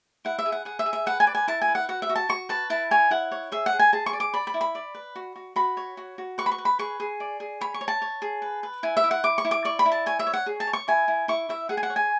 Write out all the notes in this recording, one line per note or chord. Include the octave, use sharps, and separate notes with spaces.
E4 F#5
E5
G#4
F#5
G#4 F#5
E5
G#4
E5
B4 F#5
G#5
D5
G#5
E4 A5
G#5
B4
F#5
F#4 F#5
E5
F#4
A5
F#4 C#6
B4 A5
E4 A5
C#5 G#5
E4 F#5
C#5
G#4 E5
F#5
G#4
G#5
G#4 A5
C#6
D5
D6
D5 B5
B5
E4
B5
D5
B4
F#4
F#4
F#4 B5
C#5
F#4
F#4
B4 C#6
B5
C#6
B4
B5
G#4 C#6
G#4
D5
G#4
C#5 B5
C#6
C#5
A5
C#5
G#4
B4
B4
E4 G#5
E5
E4
F#5
E4 D6
C#6
E4
D6
D5 C#6
B5
E4
A5
C#5 G#5
E5
C#5
F#5
G#4
A5
C#5
C#6
E4 G#5
E4
E4 C#6
E4 E5
G#4 F#5
G#5
F#5
C#5
G#5